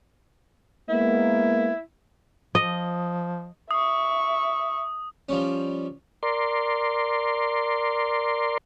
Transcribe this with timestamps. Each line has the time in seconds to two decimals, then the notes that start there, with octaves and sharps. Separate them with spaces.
0.89 G#3 A#3 B3 E4
2.55 F3 D#5
3.71 E5 C#6 D#6
5.29 F3 G3 C#4
6.23 A#4 D5 C6